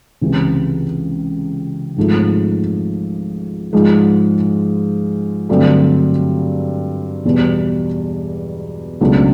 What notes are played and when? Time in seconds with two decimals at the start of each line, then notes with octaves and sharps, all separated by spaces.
0.21 C#2 C3 E3
1.97 G#1 G#2 F3 A3
3.73 G#2 F3 G#3
5.49 G2 D3 F#3 A3 C4
7.25 E2 B2 G3
9.01 C#2 B2 F#3 A3 D4